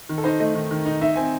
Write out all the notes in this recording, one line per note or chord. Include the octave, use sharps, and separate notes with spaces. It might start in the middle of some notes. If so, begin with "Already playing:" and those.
D#3
A4
D#4 C5
A3 D#5
D#3
D#3
D#4
D#4 E5
C4 G#5